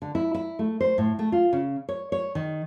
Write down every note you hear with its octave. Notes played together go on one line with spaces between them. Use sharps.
D3
E4
E4
A3
C5
A2
A3
F4
C#3
C#5
C#5
D#3